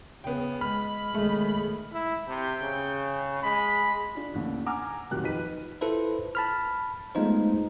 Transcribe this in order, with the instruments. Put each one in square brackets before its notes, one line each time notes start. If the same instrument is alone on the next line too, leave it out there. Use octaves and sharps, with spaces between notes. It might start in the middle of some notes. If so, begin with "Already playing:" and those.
[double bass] C#3 [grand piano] B3 G5
[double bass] G#3 [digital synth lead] B5 [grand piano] F6
[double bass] B1 D#3 [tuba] G#3 [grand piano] A3
[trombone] E4
[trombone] C3 [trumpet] G5
[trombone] C#3
[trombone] G#3 [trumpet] B5
[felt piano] D4 F4
A1 D#2 D3
F#5 G#5 A#5 D6 E6 F6
D#1 F2 D#3 F#3 G4 F#6
F3 D#4 B4 B6 D#7
[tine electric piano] E4 F4 A4 B4 C5
A5 B5 F6
G#3 A3 B3 D#4 F4 C5